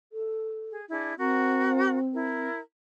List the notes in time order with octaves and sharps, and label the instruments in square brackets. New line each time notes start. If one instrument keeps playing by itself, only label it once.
[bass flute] A4
[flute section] G#4
D4 E4 G#4
[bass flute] C4 [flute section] F#4 A#4 F#5
[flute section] E4 A#4